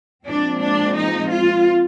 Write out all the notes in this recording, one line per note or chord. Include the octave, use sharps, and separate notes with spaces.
A#2 F3 G#3 C4 D4
D4
D#4
F4